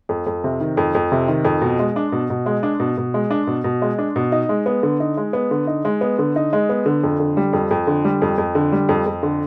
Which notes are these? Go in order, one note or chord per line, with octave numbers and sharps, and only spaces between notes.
F2
F2
C3
D#3
F2
F2
C3
D#3
F2
B2
G#3
D4
B2
B2
G#3
D4
B2
B2
G#3
D4
B2
B2
G#3
D4
B2
D#4
G#3
B3
D3
D#4
G#3
B3
D3
D#4
G#3
B3
D3
D#4
G#3
B3
D3
F2
D3
G3
F2
F2
D3
G3
F2
F2
D3
G3
F2
F2
D3